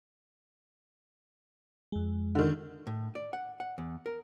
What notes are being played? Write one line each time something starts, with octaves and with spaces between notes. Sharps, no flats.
F2 G#3
D3 D#3
A2
D5
F#5
F#5
E2
A#4